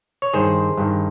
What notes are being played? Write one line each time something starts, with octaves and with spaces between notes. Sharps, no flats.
C#5
G2 D#3 G#4 C5
G2 D#3